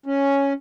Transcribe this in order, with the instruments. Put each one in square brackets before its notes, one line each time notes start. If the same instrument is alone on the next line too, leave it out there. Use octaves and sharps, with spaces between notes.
[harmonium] C#4